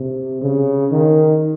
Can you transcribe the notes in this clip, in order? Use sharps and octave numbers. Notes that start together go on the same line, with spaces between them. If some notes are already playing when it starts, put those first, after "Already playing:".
Already playing: C3
C#3
D#3